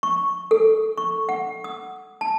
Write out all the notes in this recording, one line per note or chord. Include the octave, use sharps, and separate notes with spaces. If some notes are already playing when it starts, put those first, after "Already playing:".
C#6
A4
C#6
F#5
D#6
A5